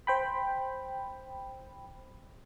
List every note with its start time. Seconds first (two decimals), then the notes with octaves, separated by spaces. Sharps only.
0.07 C5 G5 B5